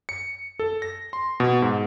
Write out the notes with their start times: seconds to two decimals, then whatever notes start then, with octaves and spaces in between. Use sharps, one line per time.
0.09 C#7
0.59 A4
0.82 A#6
1.13 C6
1.40 B2
1.62 G#2